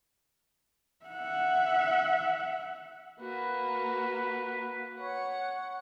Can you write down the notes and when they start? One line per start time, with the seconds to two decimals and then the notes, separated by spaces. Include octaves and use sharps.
1.06 E5 F#5
3.20 A#3 F#4 B4
5.00 C#5 F#5